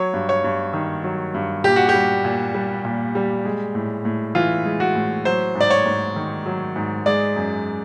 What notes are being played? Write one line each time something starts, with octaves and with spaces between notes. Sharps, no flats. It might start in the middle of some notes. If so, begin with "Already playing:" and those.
Already playing: F#3 C#5
G2
C#5
G2
D#3
F#3
G2
A#2 G4
F#4
G4
G3
A#2
G3
A#2
G3
G#3
A2
A2
E3 F4
G#3
F#4
A2
F#3 C5
G#2
D5
C#5
G#2
D#3
F#3
G#2
G#3 D5
F#2